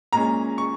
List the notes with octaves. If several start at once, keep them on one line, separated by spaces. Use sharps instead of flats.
A#2 G#3 C#4 A#5
C#6